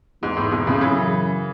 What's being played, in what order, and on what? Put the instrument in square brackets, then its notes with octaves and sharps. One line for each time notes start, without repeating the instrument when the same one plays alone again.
[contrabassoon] E2 [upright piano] G#2
[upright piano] A2
G#2 B2
A2 C#3
[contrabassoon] F#2 [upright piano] C#3 E3